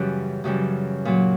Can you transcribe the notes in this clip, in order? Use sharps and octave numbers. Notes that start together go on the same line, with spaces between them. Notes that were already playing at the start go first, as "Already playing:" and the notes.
Already playing: F#2 C#3 E3 G3 G4
F#2 C#3 E3 G3
A#2 F#3